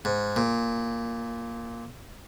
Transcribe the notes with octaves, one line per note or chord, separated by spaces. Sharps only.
G#2
A#2